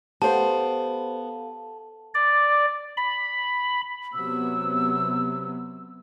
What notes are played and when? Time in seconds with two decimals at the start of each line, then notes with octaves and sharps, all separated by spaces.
0.22 B3 G4 A4 C5 F5 A5
2.14 D5
2.97 B5
4.13 C3 F#3 B3 E6